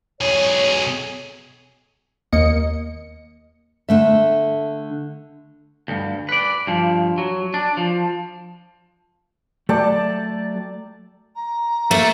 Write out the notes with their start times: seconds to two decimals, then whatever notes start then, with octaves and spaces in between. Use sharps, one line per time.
0.21 B1 G#4 C#5
2.33 D#2 A#3 D#5 C#7
3.89 D3 A3 E5
5.88 D2 G2
6.29 B4 D5
6.67 G2 F3
7.18 F#3
7.54 D4
7.77 F3
9.69 F#3 A3 D5 G5 A5
11.35 A#5
11.91 A3 A#3